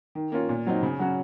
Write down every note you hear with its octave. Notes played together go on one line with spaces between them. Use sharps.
D#3
A#3 C#4 F4
A#2
F#3 C4 D#4
C#3
F#3 C#4 F#4